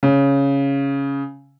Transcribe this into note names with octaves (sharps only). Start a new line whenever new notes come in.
C#3